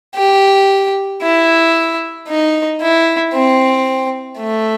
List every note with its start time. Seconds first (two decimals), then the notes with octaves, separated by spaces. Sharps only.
0.15 G4
1.22 E4
2.28 D#4
2.81 E4
3.34 C4
4.40 A3